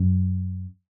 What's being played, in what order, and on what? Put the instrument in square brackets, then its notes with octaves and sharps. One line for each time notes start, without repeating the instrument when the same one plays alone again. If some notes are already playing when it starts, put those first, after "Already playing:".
Already playing: [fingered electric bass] F#2